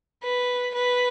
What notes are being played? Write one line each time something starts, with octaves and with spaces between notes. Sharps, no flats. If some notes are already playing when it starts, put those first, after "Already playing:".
B4
B4